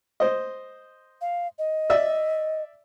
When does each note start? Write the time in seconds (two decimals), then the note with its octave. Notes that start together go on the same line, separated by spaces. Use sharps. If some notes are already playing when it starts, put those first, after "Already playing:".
0.20 C5 D#5
1.21 F5
1.59 D#5
1.90 D5 E5